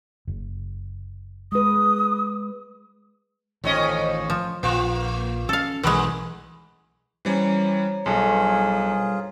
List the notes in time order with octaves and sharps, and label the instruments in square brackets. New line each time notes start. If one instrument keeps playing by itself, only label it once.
[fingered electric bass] F#1
[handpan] G#3 B4 [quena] D#6
[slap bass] A1 D#3 [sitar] F2 C#4 D#5
[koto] F3
[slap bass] A#1 [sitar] A#3 F4
[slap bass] C#4 [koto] A4 F5
[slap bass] B1 [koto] E3 G#3 [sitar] A3
[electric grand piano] E3 G3 C#4 [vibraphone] C5 C#5 A#5
[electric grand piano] B1 [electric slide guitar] G2 A4 G#5 [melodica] F4 G#4